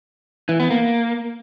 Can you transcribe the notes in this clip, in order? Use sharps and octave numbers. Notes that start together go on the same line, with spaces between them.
E3
B3
A#3